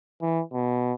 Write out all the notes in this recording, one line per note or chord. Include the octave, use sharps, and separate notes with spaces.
E3
B2